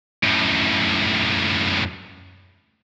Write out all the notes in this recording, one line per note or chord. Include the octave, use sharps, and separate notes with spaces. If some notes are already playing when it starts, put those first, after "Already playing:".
F#2 A2